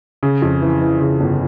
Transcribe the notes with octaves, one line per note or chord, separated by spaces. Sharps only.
C#3
F2
E3
E3
C#3
G1